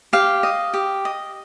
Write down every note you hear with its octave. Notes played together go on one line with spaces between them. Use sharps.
G4 F5
D#5
G4
D#5